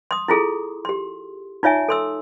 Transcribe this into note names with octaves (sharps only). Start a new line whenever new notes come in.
C6 D#6
E4 F4 G#4 A4
G4 C6
D#4 F4 C#5 E5 G#5
A4 C6 E6